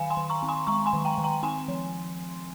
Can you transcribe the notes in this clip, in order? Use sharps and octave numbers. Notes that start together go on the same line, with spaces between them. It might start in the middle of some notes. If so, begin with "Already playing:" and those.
Already playing: D#3 F5 G#5
G#5 C6
D#3
A#5 C#6
C4
G#5 C6
G#3 A#5 C#6
G#5 C6
D#3
G5 A#5
D#3
G5 A#5
C4 G#5 C6
F3